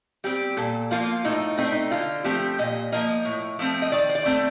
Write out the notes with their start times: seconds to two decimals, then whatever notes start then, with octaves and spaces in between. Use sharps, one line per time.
0.24 G3 C4 G4
0.57 A#2 A4
0.91 F3 A#3 F4
1.25 A2 D#4
1.58 A3 C4 D#4
1.65 D4
1.72 D#4
1.91 D3 F4
2.24 F3 A3 C4 G4
2.59 A#2 D#5
2.92 F3 A#3 D#5
3.25 A2
3.59 F3 A3 C4
3.82 D#5
3.92 D#3 D5
4.09 C5
4.15 D5
4.25 A3 C4